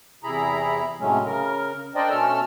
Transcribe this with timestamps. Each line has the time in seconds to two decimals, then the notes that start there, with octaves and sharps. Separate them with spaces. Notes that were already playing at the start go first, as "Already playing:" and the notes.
0.24 E2 C3 E4 G#4 A#5 B5
1.00 A2 C3 F#3 G#3 A3 C#4
1.25 C#3 A#4
1.95 D4 A#4 C5 D5 D#5 G5
2.10 B2 A3 C#4 A4 E6 F6